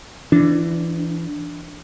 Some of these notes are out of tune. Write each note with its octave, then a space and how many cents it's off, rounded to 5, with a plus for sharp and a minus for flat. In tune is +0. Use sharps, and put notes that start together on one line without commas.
E3 +20 D4 +0